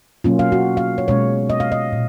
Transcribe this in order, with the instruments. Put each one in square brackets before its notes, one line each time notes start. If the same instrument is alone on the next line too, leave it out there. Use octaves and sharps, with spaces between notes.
[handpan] B2 F#3 A#3 C#4 F4
F5
F#4
F5
C#5
B2 G#3 C#4 C#5
D#5
F5
D#5
A#2